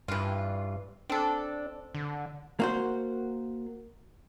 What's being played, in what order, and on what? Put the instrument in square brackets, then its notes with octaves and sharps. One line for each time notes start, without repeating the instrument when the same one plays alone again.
[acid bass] G2 [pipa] E3 F4
[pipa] C4 A4 [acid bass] D4
[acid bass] D3
[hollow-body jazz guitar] A#3 F#4 C5